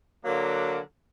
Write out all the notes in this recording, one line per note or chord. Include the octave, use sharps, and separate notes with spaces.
D3 F#3 A#3